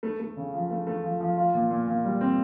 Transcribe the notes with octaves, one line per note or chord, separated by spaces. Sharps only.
A3
A3
C#3
F3
A3
A3
F3
F3
F4
A#2
A#2
A#2
G3
C4